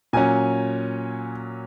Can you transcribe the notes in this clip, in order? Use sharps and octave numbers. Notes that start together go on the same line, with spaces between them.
A#2 F#3 C#4 G#5